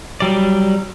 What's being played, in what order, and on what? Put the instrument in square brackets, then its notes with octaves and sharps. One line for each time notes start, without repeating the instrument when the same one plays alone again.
[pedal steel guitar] F#3 G3 D5